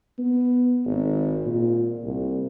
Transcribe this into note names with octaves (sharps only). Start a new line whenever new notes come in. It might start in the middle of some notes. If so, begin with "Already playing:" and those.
B3
G#1
A#2
C2